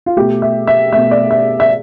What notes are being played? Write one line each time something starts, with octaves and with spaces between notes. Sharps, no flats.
F4
B2 A3 G4
E5
E5
B2 A3 E5
D5
E5
E5